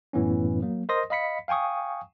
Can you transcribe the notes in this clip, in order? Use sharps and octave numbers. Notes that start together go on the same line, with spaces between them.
F#2 A2 E3 B3 C#4
F#3 A#3
A#4 C5 D#5 C6 D#6 A#6
D#5 F5 B5 B6 C#7
F5 G5 G#5 C#6 D#6